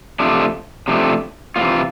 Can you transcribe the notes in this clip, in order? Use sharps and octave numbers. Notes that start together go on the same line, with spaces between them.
C3 F3 A3 D4
C3 F3 A3 D4
C3 E3 G3 B3 F4